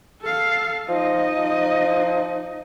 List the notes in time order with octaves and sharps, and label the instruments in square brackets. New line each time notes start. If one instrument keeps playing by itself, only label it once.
[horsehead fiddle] A4 F5
[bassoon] F3 [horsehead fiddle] D#4 D#5
[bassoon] F3